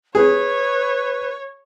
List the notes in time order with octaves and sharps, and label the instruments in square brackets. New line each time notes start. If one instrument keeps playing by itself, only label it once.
[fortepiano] G#4 [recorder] B4 [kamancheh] C#5